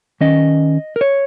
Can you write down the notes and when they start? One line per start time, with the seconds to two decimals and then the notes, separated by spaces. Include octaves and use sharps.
0.21 D#3 C#4 D#5
0.96 A#4
1.01 C#5